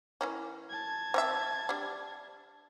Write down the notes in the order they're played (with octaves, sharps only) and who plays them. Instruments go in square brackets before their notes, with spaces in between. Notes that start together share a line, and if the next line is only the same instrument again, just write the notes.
[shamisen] E3 A#3 C#4
[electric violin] A5 G#6
[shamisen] C4 C#5 E5
G3 D4